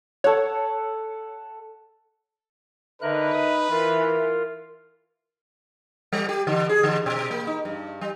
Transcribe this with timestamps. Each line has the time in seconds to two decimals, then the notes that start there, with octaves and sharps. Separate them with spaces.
0.24 A4 C#5 F#5
3.02 D3 D#4 A#4 B4 E5 F#6
3.34 D#6
3.71 E3 F4 A#4
6.13 G3
6.29 G4
6.47 D3
6.69 G#4
6.83 D3
7.06 B2
7.31 A#3
7.47 D#4
7.65 G2
8.01 G3